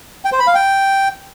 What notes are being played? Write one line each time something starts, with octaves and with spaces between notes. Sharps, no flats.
G5
C5
B5
F5
G5